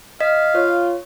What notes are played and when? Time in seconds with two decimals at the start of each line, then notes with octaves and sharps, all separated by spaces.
0.20 D#5 F5 B6
0.55 F4 C#5